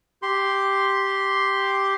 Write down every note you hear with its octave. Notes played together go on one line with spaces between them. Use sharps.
G4 C6